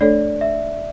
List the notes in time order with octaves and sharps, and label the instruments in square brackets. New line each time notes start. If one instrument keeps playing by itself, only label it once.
[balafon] A3 D4 A4 C#5 [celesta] D5
[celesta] E5